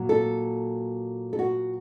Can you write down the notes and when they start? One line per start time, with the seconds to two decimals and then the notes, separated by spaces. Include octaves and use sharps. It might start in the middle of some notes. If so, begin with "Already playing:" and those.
Already playing: A#2 F#3
0.09 A4
1.33 A4
1.39 F#4